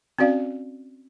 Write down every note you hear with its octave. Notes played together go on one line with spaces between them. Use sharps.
C4 C#4 F#4 D5 F5